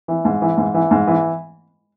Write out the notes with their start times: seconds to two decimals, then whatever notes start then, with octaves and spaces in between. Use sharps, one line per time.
0.08 E3
0.25 G#2
0.42 E3
0.57 G#2
0.74 E3
0.91 G#2
1.07 E3